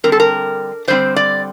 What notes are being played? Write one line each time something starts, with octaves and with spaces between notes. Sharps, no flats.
D3 G3 C4 A#4
A4
A#4
D3 G3 C4 C5
D5